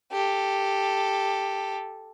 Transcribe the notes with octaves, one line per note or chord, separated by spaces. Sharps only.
G4 A4